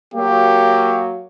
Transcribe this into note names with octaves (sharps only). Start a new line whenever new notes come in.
F#3 A#3 G4